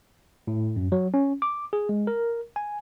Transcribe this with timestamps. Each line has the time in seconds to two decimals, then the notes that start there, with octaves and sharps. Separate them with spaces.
0.47 A2
0.76 F#2
0.92 F#3
1.14 C#4
1.42 D6
1.73 G#4
1.89 G#3
2.07 A#4
2.56 G#5